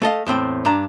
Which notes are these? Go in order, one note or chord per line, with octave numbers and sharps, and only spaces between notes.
A3 A4 D#5 F5
E2 A2 C4 G5
G2 D4 A#5